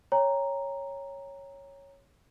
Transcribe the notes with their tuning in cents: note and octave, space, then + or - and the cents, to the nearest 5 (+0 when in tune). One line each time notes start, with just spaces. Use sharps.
C#5 +0 G5 +30 A#5 +0